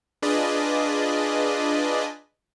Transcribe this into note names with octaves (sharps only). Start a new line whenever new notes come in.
D4 F4 G#4 B4 D5 D#5